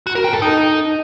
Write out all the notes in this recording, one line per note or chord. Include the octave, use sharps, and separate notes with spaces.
F#4
A#4
G5
A4
D#4